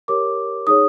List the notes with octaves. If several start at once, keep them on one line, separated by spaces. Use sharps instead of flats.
G4 A#4 C#5 D6
D#4 G#4 C#5 D#6